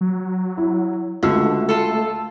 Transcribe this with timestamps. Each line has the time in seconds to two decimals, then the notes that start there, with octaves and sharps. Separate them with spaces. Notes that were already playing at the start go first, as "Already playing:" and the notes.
0.01 F#3
0.57 E4
1.23 C#2 D3 A3 F#4 E6
1.69 F4 A4